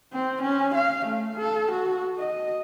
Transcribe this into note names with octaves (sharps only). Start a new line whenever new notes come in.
C4
C#4
F5
A3
A4
F#4
D#5